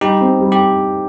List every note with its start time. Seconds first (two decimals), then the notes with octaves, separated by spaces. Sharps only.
0.01 G3 D#4 G4
0.21 C4
0.41 G3
0.52 G4